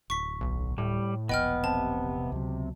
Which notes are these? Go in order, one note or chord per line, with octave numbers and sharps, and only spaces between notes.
D1 C#6 B6
B1
A2 G3
E1 A#1 B3 D#5 G5 F6
C3 A5
C#2 B2 F#3